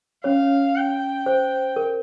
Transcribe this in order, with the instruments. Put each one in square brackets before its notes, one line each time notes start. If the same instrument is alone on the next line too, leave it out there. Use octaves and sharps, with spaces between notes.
[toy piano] C#4 C#5 [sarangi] F5
[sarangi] G5
[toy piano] C5
A#4